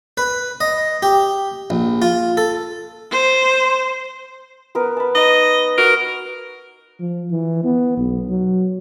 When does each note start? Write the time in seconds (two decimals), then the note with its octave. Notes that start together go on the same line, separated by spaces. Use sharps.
0.17 B4
0.61 D#5
1.03 G4
1.70 A#1
2.02 F4
2.37 A4
3.12 C5
4.75 B3 A#4 B4
4.97 A5 B5
5.15 D#4 D#5
5.78 F#4 A#4
7.00 F3
7.31 E3
7.64 B3
7.97 B1
8.29 F#3